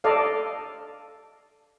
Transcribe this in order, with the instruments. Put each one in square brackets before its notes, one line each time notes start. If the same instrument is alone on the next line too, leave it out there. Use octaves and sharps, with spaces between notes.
[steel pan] A4 D5 D#5 F5